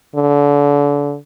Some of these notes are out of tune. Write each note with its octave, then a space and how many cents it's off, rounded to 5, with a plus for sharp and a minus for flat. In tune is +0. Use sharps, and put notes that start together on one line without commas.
D3 -30